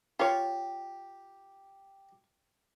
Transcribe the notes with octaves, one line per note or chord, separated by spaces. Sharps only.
F4 G4 C#5